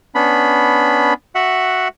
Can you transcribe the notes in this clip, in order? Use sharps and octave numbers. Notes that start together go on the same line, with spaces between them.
B3 C#4 D4 B5
F#4 E5 F#5